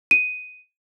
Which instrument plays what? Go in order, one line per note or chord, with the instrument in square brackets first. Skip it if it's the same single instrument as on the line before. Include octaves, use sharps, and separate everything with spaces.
[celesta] D#7